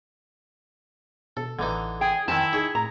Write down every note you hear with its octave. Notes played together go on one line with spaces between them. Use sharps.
B2 A4
A1 D3 E3 D#4
G#4 G5
F2 D#3 C4 E4 G#5 A5
D#4 G#4 C#5
A2 A#5